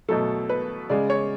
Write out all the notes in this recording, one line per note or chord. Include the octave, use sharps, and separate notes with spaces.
B2 F#3 A3 A4
B4
C#3 G#3 D5
C#5